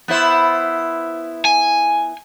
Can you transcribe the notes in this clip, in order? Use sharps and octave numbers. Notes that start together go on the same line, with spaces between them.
B3 E4 C5
G#5